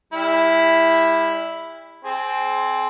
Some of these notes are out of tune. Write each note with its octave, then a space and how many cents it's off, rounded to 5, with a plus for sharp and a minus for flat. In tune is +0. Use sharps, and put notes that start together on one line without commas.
G3 +40 E4 +0
C4 +0 G#4 +35